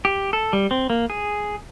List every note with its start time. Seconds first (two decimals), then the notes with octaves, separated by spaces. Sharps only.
0.05 G4
0.33 A4
0.53 G3
0.71 C4
0.90 A#3
1.10 G#4